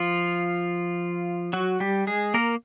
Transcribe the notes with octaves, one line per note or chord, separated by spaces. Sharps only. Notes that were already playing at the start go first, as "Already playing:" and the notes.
Already playing: F3 F4
F#3 F#4
G3 G4
G#3 G#4
A#3 A#4